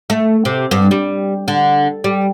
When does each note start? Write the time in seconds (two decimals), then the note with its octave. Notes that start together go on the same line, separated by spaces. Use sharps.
0.10 A3
0.45 C3
0.71 G2
0.91 G3
1.48 D3
2.04 G3